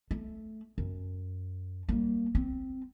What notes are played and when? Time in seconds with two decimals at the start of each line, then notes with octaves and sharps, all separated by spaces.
0.11 A3
0.78 F#2
1.89 G3 A#3
2.35 C4